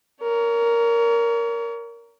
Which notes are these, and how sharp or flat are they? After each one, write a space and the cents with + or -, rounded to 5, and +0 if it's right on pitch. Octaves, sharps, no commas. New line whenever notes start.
A#4 +0 C#5 +35